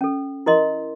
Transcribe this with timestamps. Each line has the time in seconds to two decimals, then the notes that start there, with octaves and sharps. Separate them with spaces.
0.01 C#4 A4
0.46 E4 A#4 D#5 C6